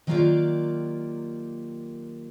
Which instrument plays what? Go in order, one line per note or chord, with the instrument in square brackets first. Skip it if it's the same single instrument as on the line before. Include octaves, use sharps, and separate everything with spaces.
[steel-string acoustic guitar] D#3 F#3 A#3 F4 G4 D5